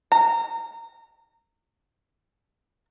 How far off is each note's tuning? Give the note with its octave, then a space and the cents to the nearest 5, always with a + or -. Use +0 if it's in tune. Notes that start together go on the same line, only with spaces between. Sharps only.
A#5 -25